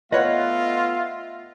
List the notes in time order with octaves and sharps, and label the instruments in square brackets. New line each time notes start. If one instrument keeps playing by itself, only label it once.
[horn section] A3 B3 E5 [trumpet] F4 [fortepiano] B4 C#5 F#5 [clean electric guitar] D#5